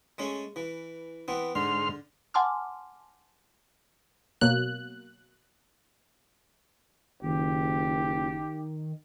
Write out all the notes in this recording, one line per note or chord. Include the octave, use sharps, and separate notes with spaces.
G#3 A3 C#4
E3
E3 B3 C4
G#2 D3 C6 F6
F#5 G#5 A5 C6 D6 F6
B2 F#3 A#3 F#6
F#1 D#3 G4